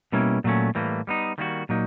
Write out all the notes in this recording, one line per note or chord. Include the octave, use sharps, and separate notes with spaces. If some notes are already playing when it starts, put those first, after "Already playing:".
B2 G3 A#3 C#4 E4
A#2 F#3 A3 C#4
A2 E3 G3 A#3
G3 B3 D#4
D#3 G3 A#3 D4 F#4
A#2 F#3 A#3 D#4